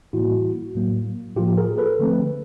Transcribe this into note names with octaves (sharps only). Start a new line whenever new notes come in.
A2 E3 G3 A#3 E4 F#4
A2 F#3 A#3
A2 F3 A#3 F4 G4
G#4 A#4
A4 B4
D3 F3 A3 C4